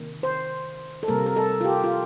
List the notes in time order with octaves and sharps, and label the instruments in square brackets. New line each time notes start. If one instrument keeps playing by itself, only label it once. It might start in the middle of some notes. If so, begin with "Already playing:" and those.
Already playing: [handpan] C3 D#3 A#3
C5
A4
C3 G3 A#3 A#4
A#4
A4
F4
G4
F4